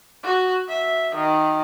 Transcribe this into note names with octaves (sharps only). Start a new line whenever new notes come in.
F#4
E5
D#3